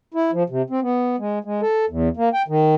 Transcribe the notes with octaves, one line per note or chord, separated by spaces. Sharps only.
E4
F3
C3
C4
B3
G#3
G#3
A4
E2
A#3
G5
D#3